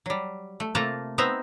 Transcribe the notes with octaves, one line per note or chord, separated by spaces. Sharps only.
F#3 G3
A3
C3 A3 A#3 F4 A5 A#5
B3 C4 D#4 C5 E5 A#5